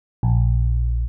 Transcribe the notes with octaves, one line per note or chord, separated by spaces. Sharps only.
A#1